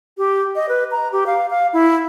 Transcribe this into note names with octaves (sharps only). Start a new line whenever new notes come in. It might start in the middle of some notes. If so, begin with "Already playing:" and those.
G4
D#5
B4
A#5
G4
F5
F5
E4